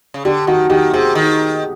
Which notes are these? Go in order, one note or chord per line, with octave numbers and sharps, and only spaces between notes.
C#3
D3 G4
D#3 F#4
D#3 G4
C3 G#4
D#3